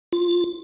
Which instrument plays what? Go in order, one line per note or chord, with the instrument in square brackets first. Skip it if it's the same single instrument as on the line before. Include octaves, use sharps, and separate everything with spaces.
[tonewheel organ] F4